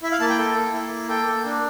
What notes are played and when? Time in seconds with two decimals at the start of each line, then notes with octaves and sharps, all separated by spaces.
0.03 E4 E5
0.12 F5
0.20 A#3 A5
0.29 G5
0.38 A4
0.56 A#3
0.73 E4
0.92 A#3
1.08 A4 G5
1.26 A#3
1.45 D4